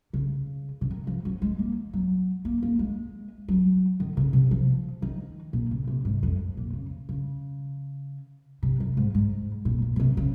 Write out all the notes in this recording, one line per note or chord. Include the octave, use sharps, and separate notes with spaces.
C#3
C#3
D#3
F3
F#3
G#3
A#3
F#3
A#3
A#3
G#3
F#3
D#3
C#3
C3
F3
D#3
A#2
C#3
C3
G#2
F2
A#2
C#3
C#3
C3
F#2
G#2
G#2
A#2
A#2
A#2
C3
C#3